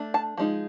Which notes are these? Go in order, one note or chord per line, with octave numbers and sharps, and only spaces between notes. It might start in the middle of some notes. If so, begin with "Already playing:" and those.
Already playing: A3 D4
A5
F3 G#3 D#4